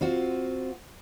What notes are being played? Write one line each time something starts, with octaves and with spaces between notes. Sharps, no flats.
C4 F4 F#4